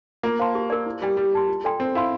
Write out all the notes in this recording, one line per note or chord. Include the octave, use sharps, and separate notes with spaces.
A#3 F4
C5 F5 A5 C6
G4
A#4 D5
E4
G3 G4 D5 G5
G3 G4
D5 A5 C6
F4
A4 D5 G5 C6
C4 A#4
E4 F5 C6